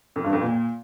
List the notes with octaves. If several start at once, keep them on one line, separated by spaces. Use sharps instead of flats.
F2
G2
F2
A#2